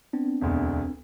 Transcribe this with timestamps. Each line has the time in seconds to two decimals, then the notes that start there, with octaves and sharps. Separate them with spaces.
0.13 B3 C4 D4
0.41 E1 D2